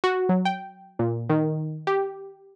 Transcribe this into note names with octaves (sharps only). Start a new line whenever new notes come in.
F#4
F#3
G5
A#2
D#3
G4